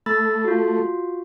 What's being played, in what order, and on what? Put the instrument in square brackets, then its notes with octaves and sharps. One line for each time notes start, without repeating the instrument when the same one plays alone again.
[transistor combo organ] A3 [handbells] B5 E6 A6
[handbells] F4 F#4